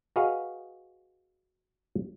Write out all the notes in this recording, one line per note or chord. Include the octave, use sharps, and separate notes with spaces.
F#4 G#4 B4 D#5 F5